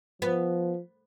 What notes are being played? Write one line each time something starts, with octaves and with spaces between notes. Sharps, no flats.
F3 B3